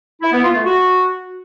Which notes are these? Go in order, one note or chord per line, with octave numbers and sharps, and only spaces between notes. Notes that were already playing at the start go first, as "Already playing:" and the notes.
E4
B3
F4
A3
F#4